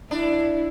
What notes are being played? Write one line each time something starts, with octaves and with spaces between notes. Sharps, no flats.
D4 E4